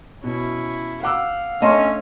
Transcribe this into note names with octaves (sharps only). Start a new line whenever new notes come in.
B2 C#4 E4
F5 F#5 D6 E6
A3 C#4 D4 D#5 A5 C6